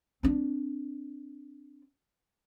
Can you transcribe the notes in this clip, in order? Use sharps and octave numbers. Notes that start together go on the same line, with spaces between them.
C4 D4